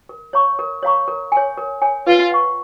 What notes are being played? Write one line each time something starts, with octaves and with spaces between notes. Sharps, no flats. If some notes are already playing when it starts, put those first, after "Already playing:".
A#4
C#5 F5 A#5 C#6
A#4
C#5 F5 A#5 C#6
A#4
C#5 G#5
A#4
C#5 G#5
F4 B4
F#5 C#6